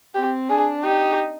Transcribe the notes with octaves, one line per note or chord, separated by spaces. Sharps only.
C4 G4
D4 G#4
D#4 G4